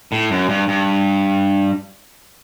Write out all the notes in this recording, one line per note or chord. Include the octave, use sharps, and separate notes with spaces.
A2
F#2
G2
G2